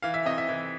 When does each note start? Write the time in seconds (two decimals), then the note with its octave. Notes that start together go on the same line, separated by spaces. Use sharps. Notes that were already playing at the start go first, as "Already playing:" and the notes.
0.02 E3 F5
0.14 E5
0.26 C3 D#5
0.38 E5
0.49 E3